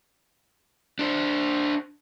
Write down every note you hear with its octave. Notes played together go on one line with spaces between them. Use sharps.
D4 C5